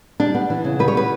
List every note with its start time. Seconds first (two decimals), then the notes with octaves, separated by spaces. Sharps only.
0.20 G3 D4
0.35 B3
0.50 E3
0.64 C#3
0.79 G3 B4
0.88 C#5
0.95 B3 B4